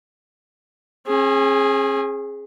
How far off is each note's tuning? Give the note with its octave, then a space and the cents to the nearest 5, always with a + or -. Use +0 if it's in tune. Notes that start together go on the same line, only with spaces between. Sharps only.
C#4 -45 G#4 +0